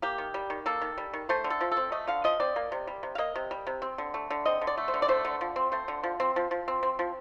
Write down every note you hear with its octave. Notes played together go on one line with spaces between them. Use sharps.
A#3 G4
D#3
G3
D#3
A#3 A4
D#3
G3
D#3
A3 C5
D3
A4
F3
A4
C4
A3 D#5
D3 F5
F3 D#5
C4 D5
A#3
C3
G3
C3
F5
A#3 D#5
C3
G3
C3
C4
D3
A3
D3
C4 D#5
D3
D5
A3
C5
D3
D5
A3 C5
D3
F3
C4
A3 C5
D3
F3
C4
F3
F3
C4
C4
F3